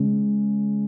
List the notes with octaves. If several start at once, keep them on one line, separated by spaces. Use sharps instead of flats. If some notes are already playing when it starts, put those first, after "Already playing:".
Already playing: C#3 G#3 C#4